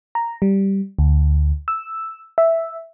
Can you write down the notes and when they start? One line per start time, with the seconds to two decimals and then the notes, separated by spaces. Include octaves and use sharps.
0.15 A#5
0.42 G3
0.99 D2
1.68 E6
2.38 E5